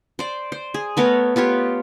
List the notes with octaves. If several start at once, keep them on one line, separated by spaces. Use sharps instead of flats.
C5 D5
C5
G#4
A3 B3 A#4 C#5
B3 F4 G4 C#5